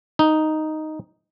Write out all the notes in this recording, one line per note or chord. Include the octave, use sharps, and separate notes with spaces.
D#4